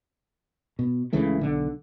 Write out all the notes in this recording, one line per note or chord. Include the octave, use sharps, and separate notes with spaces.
B2
C#2 C#3 E3 A3
B1 D3